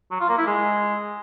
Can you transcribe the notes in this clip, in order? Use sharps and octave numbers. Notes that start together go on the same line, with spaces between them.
F#3
F4
A#3
E4
G#3